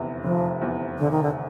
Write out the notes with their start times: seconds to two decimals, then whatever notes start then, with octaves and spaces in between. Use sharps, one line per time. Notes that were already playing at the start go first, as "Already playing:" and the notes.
Already playing: F1 E2 C3
0.24 F1 F3
0.62 E2 C3
0.98 F1 D3
1.11 D#3
1.23 D3